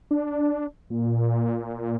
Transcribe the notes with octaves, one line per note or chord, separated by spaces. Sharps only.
D4
A#2